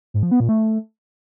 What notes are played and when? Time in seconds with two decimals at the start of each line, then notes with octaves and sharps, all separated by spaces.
0.14 G#2
0.23 F3
0.31 B3
0.40 A#2
0.49 A3